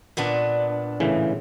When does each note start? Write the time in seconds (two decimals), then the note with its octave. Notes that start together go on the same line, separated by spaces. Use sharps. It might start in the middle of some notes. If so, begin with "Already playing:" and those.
0.17 A#2 B3 D4
1.00 A2 C#3 E3